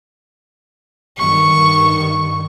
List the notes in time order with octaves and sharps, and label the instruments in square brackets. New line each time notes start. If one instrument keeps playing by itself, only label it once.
[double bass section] G2 D#3 [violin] C#6